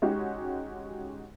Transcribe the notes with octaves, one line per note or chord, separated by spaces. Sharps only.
G#3 C#4 D#4 F#4 G4